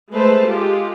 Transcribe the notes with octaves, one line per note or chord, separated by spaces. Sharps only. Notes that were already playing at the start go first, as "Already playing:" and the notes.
G#3 A3 B4 C5 A5
G#3 F4 G4 A4